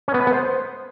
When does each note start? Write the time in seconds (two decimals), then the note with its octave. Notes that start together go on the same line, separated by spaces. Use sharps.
0.08 C#4
0.14 B3
0.21 B4
0.27 B3
0.33 C5